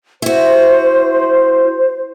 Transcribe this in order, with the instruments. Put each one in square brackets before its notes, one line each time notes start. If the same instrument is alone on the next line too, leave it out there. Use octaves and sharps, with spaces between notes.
[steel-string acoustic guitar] E4 F#4 [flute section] C5